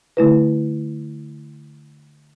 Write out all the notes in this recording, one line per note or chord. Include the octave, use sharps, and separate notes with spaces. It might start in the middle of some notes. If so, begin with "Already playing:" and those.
D3 A3 E4 B4